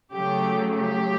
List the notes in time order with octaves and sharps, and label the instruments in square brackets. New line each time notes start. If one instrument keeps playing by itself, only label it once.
[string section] C#3 F#3 A3 G4
G4